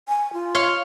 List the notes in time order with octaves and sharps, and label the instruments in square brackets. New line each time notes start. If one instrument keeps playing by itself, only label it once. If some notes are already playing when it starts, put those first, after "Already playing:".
[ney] G#5
F4
[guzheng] C#5 F5 C6